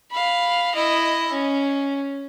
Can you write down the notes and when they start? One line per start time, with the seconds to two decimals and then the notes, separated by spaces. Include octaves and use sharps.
0.11 F5 B5
0.75 E4 D#5
1.32 C#4